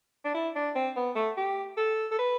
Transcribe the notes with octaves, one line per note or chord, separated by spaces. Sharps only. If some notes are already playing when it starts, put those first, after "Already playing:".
D4
E4
D4
C4
B3
A3
G4
A4
A4
B4